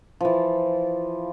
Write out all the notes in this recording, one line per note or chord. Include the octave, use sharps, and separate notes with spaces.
E3 F3